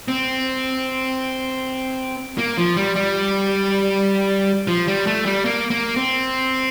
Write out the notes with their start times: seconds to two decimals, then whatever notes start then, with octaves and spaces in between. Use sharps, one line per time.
0.08 C4
2.38 A#3
2.57 F3
2.76 G3
2.96 G3
4.68 F3
4.87 G3
5.07 A3
5.26 G3
5.45 A#3
5.70 A#3
5.96 C4